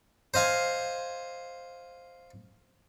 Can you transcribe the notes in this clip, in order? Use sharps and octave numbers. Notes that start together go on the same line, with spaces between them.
C5 D#5 F5 G#5